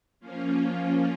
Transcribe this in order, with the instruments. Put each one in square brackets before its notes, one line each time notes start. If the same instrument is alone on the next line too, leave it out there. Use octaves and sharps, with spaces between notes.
[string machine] F3 A#3 C#4 F4